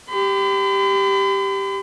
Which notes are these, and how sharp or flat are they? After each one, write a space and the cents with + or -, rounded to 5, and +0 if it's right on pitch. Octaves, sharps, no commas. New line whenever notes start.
G4 +0 B5 +45